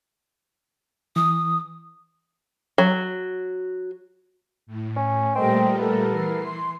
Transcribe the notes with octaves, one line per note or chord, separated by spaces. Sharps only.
E3 D#6
F#3
A2
C#4
A#2 G3 A3 C4 A#4 D#5 G5
B3 A4 A#4
E3 C7
C6